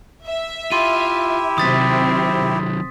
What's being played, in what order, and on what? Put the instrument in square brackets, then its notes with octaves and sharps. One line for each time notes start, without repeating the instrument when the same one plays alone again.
[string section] E5
[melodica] E4 G4 [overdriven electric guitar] F4 [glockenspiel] C6 D#7
[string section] C3 C4 [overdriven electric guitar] D#3 F#3 [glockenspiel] D#6 A6 B6